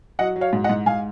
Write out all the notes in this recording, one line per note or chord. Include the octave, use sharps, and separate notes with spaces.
F#3 D#5 F#5
F#3
C#5 F5
G#2
D#5 F#5
G#2
G#2 F5 G#5